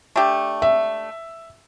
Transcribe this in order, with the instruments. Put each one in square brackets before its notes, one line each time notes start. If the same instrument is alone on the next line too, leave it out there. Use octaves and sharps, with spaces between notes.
[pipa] A3 D4 G4
[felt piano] E5